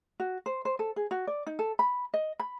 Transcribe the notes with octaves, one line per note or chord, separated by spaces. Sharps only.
F#4
C5
C5
A4
G#4
F#4
D5
D#4
A4
B5
D#5
B5